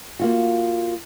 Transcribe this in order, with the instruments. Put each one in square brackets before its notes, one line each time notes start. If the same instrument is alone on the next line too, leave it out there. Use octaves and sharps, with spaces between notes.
[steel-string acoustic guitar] A#3 F4 F#4